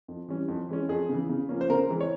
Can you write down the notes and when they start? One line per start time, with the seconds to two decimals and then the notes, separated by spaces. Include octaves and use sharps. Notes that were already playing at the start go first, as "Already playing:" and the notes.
0.08 F2
0.28 E3 G3 C#4
0.48 F2
0.69 E3 G#3 C#4
0.89 F2 G#4
1.09 C#3 E3
1.29 C#3
1.49 F3 A#3 C#4
1.61 C5
1.70 C#3 A#4
1.90 E3 G#3 C4
2.00 C#5